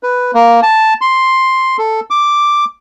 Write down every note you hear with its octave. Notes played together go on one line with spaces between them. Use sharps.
B4
A#3
A5
C6
A4
D6